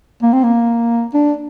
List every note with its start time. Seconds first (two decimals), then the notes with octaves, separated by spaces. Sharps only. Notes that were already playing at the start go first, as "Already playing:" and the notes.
0.23 A#3
0.33 C4
0.44 A#3
1.14 D4